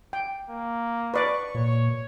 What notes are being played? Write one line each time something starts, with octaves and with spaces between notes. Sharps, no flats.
G5
A#3
B4 D5 C#6
A#2 C#5